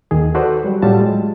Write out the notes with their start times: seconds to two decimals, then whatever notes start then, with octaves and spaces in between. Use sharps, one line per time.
0.11 D#2 D#3 G#4
0.35 F#4 A4 B4 C5 D5
0.65 F#3 G3
0.82 A2 F#3 G3 F4 A5
1.00 G#3